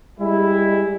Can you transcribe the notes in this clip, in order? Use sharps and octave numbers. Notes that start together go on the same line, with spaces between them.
G3 G#3 E4